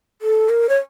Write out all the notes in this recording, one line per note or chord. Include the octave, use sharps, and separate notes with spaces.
A4
A#4
C#5